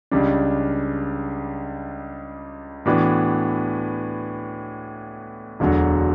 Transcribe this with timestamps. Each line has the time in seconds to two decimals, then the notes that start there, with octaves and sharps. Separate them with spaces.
0.11 C#2 C#3 G3 D4
2.86 A2 E3 B3 D4 F#4
5.60 E1 D2 D3 F#3